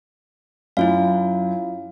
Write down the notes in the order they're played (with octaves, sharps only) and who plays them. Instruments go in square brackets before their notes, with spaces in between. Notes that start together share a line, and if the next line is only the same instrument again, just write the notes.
[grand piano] F#2 [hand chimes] E4 F4 F5